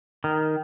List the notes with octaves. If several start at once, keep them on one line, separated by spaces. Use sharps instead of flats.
D#3